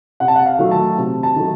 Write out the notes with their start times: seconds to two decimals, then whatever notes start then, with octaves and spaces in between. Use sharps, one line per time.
0.20 C3 F#5
0.28 A5
0.36 F#5
0.46 F5
0.59 D#3 F#3 A3
0.71 A5
0.98 C3
1.23 A5
1.36 D#3 F#3 A3